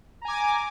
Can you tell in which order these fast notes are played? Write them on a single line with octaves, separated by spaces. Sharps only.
A#5 G#5 D6